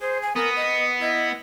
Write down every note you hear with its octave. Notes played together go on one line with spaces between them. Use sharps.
G#4 C5
G#5
B3 A#4 D#6
D#5
E4 D#5